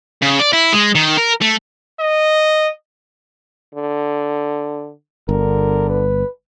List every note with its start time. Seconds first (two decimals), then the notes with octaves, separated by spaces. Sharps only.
0.22 C#3
0.39 D5
0.53 E4
0.73 G#3
0.95 D#3
1.17 A#4
1.42 A3
2.00 D#5
3.75 D3
5.29 G1 D3 A#4
5.89 B4